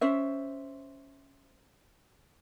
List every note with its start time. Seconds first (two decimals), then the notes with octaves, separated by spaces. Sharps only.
0.01 C#4 C5 E5